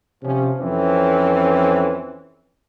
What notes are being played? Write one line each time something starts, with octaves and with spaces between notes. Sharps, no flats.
C3 F3 C#4
F2 E3 C4 C#4